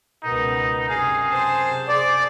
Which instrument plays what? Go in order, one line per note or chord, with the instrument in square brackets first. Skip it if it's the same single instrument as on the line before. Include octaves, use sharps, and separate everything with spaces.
[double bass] C#2 B2 [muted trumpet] D#4 [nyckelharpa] A#4 B4
[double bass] F#2 C3 [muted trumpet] G#4 [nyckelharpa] F5
[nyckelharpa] C5 A5
[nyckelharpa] G#4 C5 [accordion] D5